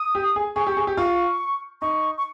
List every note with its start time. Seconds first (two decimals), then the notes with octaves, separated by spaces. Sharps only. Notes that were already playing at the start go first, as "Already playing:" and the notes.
Already playing: D#6
0.15 G4
0.36 G#4
0.56 G#4 C#6
0.67 G4
0.77 G#4
0.87 G4
0.97 F4 C#6
1.82 D#4 C#6
2.18 C#6